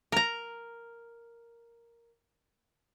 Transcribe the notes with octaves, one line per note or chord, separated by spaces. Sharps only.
A#4 A#5